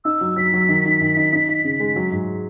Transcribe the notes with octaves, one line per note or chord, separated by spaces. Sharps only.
D#4 E6
F#3
F#3 B6
F#3
D#3
D#4
D#3
D#4
D#4
D#4
C#3
G#3
F#3
G#2